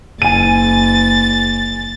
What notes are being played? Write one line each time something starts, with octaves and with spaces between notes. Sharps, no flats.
F#1 G#5 A6 D#7